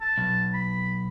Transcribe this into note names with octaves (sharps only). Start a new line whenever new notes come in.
A5
B1
B5